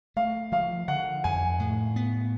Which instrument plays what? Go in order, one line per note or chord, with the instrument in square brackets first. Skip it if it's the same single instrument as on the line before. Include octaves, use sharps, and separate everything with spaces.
[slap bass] A3 [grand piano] F5
[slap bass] F3 [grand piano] F5
[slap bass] D3 [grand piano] F#5
[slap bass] F2 [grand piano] G#5
[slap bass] A2
B3